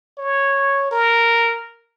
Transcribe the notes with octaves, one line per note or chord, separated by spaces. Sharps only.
C#5
A#4